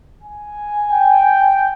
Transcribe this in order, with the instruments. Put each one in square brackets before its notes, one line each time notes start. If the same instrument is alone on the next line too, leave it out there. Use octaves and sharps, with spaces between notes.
[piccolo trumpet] G#5
[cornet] G5